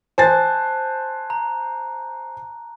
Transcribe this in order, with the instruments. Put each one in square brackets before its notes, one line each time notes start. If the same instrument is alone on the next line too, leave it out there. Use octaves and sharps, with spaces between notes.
[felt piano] C5 G#5 A6 [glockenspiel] A5 F#6
[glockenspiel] A#5